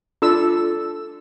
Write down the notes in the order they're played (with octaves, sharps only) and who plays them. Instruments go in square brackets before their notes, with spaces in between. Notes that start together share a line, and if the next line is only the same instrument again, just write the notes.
[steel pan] D4 A4 E6 [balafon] F4